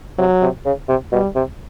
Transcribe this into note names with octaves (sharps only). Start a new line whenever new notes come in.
C3 F#3
C3
C#3
C3
B2 G3
C3